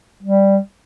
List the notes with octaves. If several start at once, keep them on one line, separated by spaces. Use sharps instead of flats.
G3